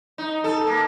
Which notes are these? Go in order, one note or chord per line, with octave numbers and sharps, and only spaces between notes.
D#4
A4
A#3